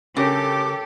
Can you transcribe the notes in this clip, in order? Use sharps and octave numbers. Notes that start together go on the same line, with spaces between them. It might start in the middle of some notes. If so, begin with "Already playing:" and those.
C#3 G4 A4 A#4 C#5 D6